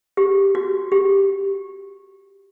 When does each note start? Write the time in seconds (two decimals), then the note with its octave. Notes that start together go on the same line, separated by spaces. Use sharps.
0.17 G4
0.55 F#4
0.92 G4